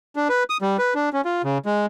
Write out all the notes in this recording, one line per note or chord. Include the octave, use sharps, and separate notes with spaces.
D4
B4
D#6
G3
B4
D4
C#4
F4
C#3
G#3